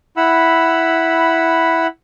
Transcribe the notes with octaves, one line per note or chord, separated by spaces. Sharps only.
E4 F#5 B5 E6